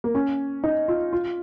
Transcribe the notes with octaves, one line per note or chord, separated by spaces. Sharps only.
A#3
C#4
D#4
F4
F4